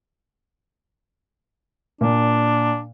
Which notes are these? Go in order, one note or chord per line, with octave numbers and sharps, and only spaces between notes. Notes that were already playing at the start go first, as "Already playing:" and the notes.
A#2 D4